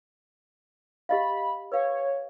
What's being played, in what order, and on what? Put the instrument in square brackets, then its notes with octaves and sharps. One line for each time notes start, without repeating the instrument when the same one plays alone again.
[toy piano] G4 D#5 F5 [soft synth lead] B5
[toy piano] B4 F5 [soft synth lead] C#5